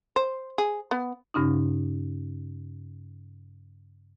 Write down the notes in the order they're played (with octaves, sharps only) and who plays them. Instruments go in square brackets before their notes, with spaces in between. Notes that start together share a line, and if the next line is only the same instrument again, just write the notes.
[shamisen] C5
G#4
B3
[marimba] G2 C#3 C#4 D#4